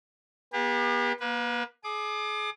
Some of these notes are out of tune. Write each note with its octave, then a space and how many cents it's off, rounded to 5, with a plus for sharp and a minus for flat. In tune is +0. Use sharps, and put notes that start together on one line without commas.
B3 -40 G4 +40
A#3 +35 B4 +0
G#4 +30 D6 +35